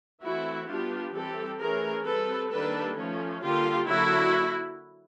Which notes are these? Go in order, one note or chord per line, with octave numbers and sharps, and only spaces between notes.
E3 A3 C4 E4 F#4
G3 B3 D4 F4 G4
E3 G3 C4 G4 A4
E3 A3 C#4 G#4 A#4
G3 C4 A4 B4
D#3 G3 A#3 D4 A4 B4
F3 A3 C#4
D3 G3 A#3 F4 G4
D3 F#3 A#3 E4 F#4